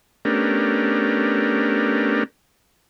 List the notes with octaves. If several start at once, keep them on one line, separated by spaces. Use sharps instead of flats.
A3 B3 C#4 D4 G4 A#4